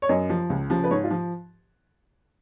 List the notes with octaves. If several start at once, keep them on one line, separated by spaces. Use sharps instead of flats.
C#5
F#2 D#5
F3
C#2
C#3 F3
B4
G#2 C#5
F4
F3